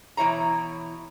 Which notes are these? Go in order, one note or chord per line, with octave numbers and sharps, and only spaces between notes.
B2 E3 E4 C#5 A#5